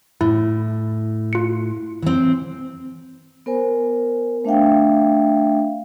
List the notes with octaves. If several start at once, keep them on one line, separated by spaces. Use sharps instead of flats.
A2 E4
F4 C#7
E3 C4
B3 A#4 C5 G#5
A3 D4 E5 F5 G5